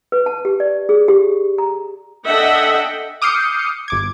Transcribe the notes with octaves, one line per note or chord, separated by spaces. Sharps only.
B4
A5
G4
D5
G#4
G4
A#5
D4 A4 D#5 E5 F#5 G5
D6 D#6 F6 G6 C7 C#7
G1 D6 G#6